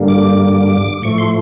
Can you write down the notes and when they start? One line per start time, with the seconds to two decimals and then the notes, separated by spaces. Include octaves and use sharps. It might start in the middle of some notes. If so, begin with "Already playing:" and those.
Already playing: G2 D3 G3 A#3
0.08 D6
1.02 A2 F3 A3 C#6
1.18 C6